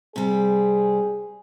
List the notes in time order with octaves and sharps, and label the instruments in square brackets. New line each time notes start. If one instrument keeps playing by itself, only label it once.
[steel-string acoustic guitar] C3 G3 [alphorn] G#4